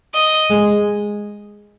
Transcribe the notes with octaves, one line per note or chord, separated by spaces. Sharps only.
D#5
G#3